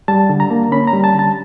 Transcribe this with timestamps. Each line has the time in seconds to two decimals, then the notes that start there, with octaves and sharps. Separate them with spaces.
0.08 G3 A5
0.29 D3
0.40 A#5
0.50 A#3
0.72 C#4 B5
0.87 A#5
0.93 G3
1.04 A5
1.14 D3 A5